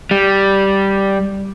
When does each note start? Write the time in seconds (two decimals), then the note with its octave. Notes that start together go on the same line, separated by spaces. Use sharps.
0.11 G3